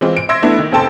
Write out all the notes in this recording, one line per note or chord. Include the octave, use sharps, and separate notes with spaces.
E3 G#3 C4 F4
D7
E5 C6 E6 G#6 A#6
A3 B3 D4 E4
D#3
F1 C4 A4 G5 A5 C6